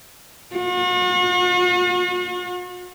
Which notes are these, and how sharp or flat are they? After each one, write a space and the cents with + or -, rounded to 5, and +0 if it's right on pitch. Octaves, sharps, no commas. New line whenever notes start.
F#4 -45